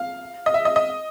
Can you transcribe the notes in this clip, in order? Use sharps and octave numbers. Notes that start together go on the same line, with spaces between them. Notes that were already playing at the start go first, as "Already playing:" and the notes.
Already playing: F5
D#5
E5
D#5
D#5